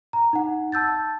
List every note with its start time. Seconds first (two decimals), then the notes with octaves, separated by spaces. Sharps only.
0.13 A#5
0.33 D#4 F#5
0.72 A5 E6 G6 A6